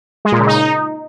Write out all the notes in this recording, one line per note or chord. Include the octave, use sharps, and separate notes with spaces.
G#3
A#2
C#3
D#4